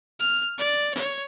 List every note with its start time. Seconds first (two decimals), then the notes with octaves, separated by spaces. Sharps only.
0.20 F6
0.58 D5
0.95 C#5